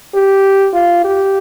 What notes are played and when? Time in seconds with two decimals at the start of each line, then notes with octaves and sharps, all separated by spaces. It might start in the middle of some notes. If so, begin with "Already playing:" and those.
0.15 G4
0.74 F4
1.05 G4